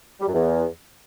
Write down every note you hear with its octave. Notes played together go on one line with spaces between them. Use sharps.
G3
F#2
E2